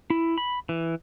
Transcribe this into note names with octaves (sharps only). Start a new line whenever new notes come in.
E4
B5
E3